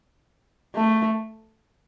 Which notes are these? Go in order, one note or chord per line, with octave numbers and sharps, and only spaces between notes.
A3